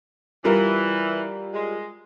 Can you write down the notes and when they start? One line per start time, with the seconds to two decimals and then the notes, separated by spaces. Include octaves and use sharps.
0.44 E3 G3 F4 A#4
1.54 G#3